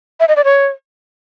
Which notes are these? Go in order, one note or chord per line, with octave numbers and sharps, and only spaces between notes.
E5
D#5
D5
C#5